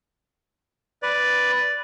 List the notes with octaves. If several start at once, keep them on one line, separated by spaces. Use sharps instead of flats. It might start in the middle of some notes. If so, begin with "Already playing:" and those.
B4 D5